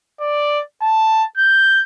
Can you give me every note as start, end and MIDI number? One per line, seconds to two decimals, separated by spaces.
0.21 0.59 74
0.82 1.23 81
1.38 1.83 91